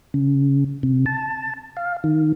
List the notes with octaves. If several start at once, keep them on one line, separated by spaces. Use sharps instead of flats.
C#3
C3
A5
F5
D#3